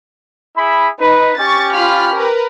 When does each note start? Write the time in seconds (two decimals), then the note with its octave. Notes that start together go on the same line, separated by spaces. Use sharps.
0.57 E4 G#4 B5
1.00 D#4 B4
1.39 C#4 G4 C#6 A6
1.74 F4 B5 F6
2.14 A#4 B4